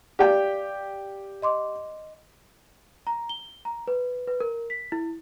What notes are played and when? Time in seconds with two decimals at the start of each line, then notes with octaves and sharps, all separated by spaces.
0.19 G4 D5 F5 G5
1.42 D#5 C6 D6
3.07 A#5
3.29 G7
3.65 A#5
3.88 B4
4.27 B4
4.40 A#4
4.70 B6
4.92 E4